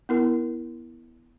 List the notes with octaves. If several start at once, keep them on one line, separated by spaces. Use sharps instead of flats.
B3 E4 A#4